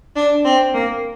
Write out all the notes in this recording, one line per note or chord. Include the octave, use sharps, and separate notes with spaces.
D4
C4
A#3